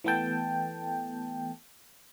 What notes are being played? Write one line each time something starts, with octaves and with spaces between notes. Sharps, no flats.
E3 A3 B3 A4 G5 A5